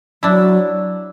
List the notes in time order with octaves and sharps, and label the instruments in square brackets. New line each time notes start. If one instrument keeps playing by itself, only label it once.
[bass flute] F#3 [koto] D4 E4